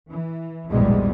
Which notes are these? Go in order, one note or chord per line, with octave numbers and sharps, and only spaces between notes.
E3
A#1 E2 G#2 B2 G3 G#3